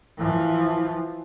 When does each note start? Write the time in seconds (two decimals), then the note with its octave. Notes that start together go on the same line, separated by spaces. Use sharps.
0.18 E3 F3